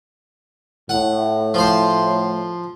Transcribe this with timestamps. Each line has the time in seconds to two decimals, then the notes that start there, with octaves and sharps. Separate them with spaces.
0.89 A2 F#5
1.54 F3 C5